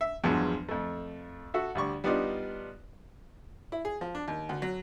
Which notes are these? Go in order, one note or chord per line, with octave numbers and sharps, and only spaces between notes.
E5
E2 G2 F3 F#3 G#3
F2 A3
F#4 A4 E5
D2 G3 D5 C#6
G3 B3 D4 D#4 F4 D5
E4
G#4
F3
D4
D#2
D2
F#3